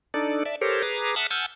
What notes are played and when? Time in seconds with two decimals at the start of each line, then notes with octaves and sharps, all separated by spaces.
0.14 D4 D#4 A4 D5
0.45 D5 E5 A5
0.61 G4 A4 A#4 C5 C#5
0.83 G#4 B4 A#5 D6
1.16 E5 F#5 A5 D#6 F6 F#6
1.31 F#5 G#5 A5 E6 F6 G6